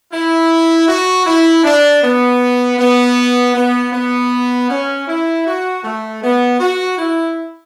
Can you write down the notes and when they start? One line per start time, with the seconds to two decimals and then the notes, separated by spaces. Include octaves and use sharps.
0.12 E4
0.88 F#4
1.26 E4
1.63 D4
2.03 B3
2.78 B3
3.55 B3
3.92 B3
4.70 C#4
5.08 E4
5.46 F#4
5.83 A3
6.22 B3
6.60 F#4
6.98 E4